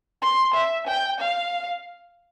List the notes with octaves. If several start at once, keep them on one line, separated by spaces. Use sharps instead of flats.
C6
E5
G5
F5